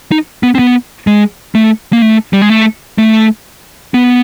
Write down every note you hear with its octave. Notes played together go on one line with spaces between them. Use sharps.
D#4
B3
C4
B3
G#3
A3
A#3
A3
G3
G#3
A3
A3
B3